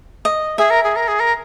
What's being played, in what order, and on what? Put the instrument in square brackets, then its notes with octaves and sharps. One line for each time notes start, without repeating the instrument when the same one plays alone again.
[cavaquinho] D#5
[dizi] G#4 [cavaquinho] E5
[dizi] A#4
G#4
A#4
G#4
A#4